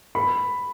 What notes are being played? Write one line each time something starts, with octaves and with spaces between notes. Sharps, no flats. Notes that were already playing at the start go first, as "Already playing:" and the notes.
B5